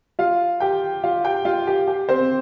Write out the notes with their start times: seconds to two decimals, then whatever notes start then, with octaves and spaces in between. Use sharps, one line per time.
0.19 F4 F5
0.60 G4 G5
1.04 F4 F5
1.25 G4 G5
1.45 F4 F5
1.67 G4
1.88 G4
2.09 C4 C5